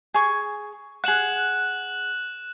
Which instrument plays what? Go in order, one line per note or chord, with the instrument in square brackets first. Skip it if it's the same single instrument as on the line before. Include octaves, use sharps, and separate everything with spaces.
[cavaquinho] G#4 G#5 C#6
[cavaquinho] G#4 F#5 [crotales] F#6 E7 F#7